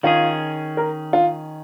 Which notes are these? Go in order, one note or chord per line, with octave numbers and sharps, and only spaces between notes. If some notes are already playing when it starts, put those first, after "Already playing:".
D#3 C#4 F4 G#4
A#4
F4